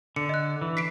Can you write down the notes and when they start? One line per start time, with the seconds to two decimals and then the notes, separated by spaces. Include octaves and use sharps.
0.16 D3 C#7
0.29 D#5 F#6
0.61 E3
0.77 B6 C7 D7